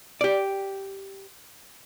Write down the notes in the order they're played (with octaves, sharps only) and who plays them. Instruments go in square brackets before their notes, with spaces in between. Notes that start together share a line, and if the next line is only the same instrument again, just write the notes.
[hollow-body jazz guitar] G4 D5